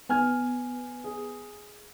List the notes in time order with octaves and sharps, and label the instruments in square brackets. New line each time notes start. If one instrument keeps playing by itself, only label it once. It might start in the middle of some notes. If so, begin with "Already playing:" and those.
[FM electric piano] B3 [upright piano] G#5 F6 G#6
[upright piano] G#4